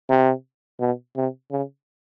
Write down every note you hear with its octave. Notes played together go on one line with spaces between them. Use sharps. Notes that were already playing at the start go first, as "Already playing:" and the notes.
C3
B2
C3
C#3